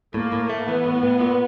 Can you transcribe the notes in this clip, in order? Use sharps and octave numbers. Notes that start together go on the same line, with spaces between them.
A2 A#3
A2
A3
E3 B3
A2
A2
A#2